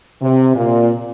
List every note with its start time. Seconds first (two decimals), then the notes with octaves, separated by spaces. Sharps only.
0.20 C3
0.55 A#2